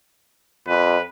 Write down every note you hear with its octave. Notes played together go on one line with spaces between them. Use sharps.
F2 B4